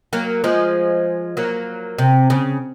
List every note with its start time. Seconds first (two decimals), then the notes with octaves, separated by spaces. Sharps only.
0.13 F#3 A#3
0.44 F3 G#3
1.37 F#3 A#3
1.98 C3
2.30 C#3